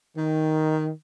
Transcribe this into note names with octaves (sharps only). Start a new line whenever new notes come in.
D#3